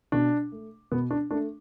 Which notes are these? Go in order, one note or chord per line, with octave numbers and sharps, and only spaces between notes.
B2 D4
A3
B2 B3
D4
A3 D4